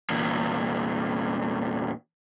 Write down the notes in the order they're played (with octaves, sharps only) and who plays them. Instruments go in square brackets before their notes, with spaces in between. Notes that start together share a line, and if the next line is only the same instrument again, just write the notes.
[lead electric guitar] E2 A#2